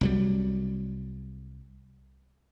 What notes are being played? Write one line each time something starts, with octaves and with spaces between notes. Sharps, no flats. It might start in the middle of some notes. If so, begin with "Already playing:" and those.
C2 F#3 G3